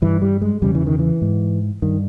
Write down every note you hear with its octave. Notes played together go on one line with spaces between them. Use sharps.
G2 E3
G3
G#3
E2 C#3 G3
E3
D#3
E3
G#2
G2 D#3